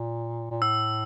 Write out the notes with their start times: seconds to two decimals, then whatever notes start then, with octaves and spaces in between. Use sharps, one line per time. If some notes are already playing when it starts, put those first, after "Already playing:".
Already playing: A#2
0.51 A#2
0.62 A2 E6